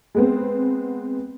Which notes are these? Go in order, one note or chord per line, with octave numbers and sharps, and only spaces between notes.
G#3 B3 C4